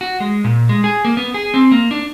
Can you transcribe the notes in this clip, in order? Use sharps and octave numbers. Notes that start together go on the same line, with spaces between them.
F#4
G#3
A#2
G#3
G#4
A#3
B3
G#4
C4
A#3
D4